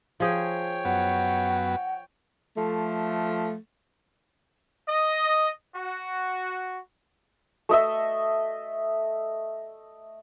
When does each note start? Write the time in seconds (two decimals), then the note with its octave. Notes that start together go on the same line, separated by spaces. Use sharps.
0.20 F3 G#4 C#5 G5
0.85 F#2 B3 F#5
2.57 F3 A3
4.88 D#5
5.75 F#4
7.69 A3 D#5 E5